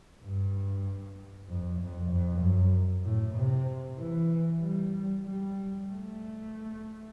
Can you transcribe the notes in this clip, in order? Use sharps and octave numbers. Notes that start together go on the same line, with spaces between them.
G2
F2
F2
F2
F#2
A2
C3
E3
G3
G3
A3